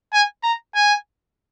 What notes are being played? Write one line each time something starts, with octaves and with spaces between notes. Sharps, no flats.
G#5
A#5
G#5